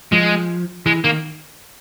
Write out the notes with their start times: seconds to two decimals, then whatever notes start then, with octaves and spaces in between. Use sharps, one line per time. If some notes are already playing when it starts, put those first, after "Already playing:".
0.12 F3 G#3
0.86 E3 G#3
1.04 D#3 A#3